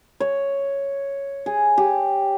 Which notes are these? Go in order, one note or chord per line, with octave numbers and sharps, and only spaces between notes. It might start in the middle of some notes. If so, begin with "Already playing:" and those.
C#5
G#4
G4